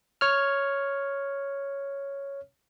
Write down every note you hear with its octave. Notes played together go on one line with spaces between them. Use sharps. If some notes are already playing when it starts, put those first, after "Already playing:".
C#5 F6